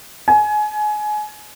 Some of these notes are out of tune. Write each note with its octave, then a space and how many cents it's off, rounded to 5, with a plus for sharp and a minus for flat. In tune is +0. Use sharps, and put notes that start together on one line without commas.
G#5 +25